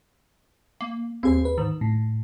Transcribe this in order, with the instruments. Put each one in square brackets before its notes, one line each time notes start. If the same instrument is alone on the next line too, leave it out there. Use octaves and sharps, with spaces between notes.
[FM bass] A#3
[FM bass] D#2 [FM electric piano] C4 G#4 C5
[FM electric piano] B4
[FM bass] G#2 [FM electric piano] D#3
[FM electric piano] A2